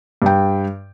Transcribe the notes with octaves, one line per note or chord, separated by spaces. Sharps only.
G2 G5